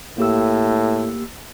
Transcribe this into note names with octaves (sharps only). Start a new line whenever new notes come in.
A2 A#3 G4 E6